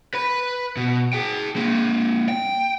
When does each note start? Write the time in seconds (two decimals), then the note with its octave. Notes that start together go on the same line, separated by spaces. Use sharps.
0.14 B4 B5
0.77 B2
1.13 G#4 G5
1.56 A#3 C4
2.29 G5